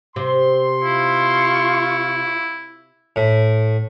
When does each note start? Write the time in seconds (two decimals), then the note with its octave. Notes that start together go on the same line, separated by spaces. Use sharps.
0.16 C3 C6
0.84 E4 F4 C#6
3.16 A2